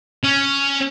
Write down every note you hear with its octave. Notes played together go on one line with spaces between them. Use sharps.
C#4